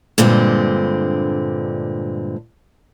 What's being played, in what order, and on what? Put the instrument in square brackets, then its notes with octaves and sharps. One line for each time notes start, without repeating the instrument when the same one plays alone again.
[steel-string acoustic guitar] G2 A#2 D3 G#3 C4